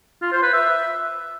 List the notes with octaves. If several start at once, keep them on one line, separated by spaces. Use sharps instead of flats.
F4
C5
B4
E5